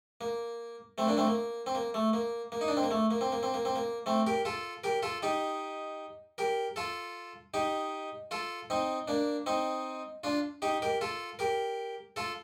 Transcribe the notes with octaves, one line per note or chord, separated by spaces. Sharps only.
A#3
A3 C4
A#3 D4
A3 C4
A#3
C4
A#3
A3
A#3
A#3
D#4
D4
C4
A#3
A3
A#3
C4
A#3
C4
A#3
C4
A#3
A3 C4
G4 A#4
F4 A4
G4 A#4
F4 A4
D#4 G4
G4 A#4
F4 A4
D#4 G4
F4 A4
C4 D#4
A#3 D4
C4 D#4
D4 F4
D#4 G4
G4 A#4
F4 A4
G4 A#4
F4 A4